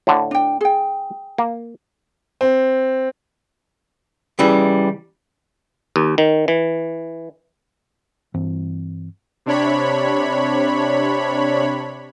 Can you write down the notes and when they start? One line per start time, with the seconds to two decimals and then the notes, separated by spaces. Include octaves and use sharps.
0.07 A2 D3
0.31 D4 G5
0.61 G#4 G5
1.38 A#3
2.41 C4
4.39 C#3 E3 G3
5.96 D#2
6.18 D#3
6.48 E3
8.34 G2 E3 C4
9.46 C3 D4 C#5 B5